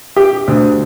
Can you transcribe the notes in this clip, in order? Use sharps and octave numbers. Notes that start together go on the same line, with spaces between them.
G4
D2